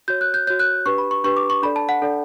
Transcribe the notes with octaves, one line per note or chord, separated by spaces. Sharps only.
F#4 C#5 G6
F#6
G6
F#4 C#5 G6
F#6
D4 G4 B4 C#6
B5
C#6
D4 G4 B4 C#6
D6
C#6
D4 A4 D5 B5
A5
F#5
D4 A4 D5